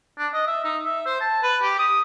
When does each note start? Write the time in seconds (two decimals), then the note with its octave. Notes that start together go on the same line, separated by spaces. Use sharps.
0.18 D4
0.34 D#5
0.48 E5
0.65 D#4
0.85 E5
1.06 C5
1.21 A5
1.43 B4
1.62 G4
1.79 D#6